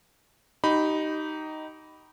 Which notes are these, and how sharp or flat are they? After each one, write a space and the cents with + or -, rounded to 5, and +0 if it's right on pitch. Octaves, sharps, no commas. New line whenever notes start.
D#4 +0 G4 -30 B5 +0